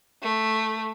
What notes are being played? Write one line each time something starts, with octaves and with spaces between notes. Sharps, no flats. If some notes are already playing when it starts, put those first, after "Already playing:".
A3